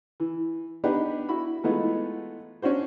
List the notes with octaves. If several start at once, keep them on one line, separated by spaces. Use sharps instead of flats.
E3
B3 D4 D#4 G4 B4
E4 F#4 B5
E3 G#3 A3 B3 D#4 F4
C#4 D4 F#4 C5